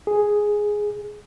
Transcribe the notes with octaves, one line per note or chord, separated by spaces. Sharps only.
G#4